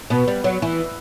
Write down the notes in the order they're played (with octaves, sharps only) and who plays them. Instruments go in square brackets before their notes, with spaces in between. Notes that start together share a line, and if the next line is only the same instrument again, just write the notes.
[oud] B2 [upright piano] B3
[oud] G3
F#3
E3